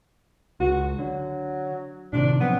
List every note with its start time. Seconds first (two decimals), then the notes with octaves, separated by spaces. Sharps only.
0.60 C#2 F#4
0.98 D3 F#3
2.13 A2 C3 D#3 D4
2.40 F3 F#3 B3 C4